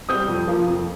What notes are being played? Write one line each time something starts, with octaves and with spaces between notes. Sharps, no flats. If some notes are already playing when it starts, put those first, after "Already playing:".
G3 C4 D#6 G6
F2
F3 A#3
F2